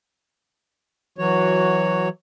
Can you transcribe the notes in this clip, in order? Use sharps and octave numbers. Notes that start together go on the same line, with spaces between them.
E3 F#3 F#4 C#5